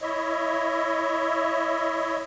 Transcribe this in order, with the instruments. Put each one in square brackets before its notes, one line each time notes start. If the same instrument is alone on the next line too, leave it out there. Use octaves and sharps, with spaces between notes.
[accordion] E4 C#5 D#5 E5